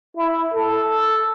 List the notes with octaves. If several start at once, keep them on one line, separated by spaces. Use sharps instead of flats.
E4
A4